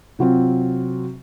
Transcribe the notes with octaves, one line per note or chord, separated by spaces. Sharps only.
C3 F#3 C4 F4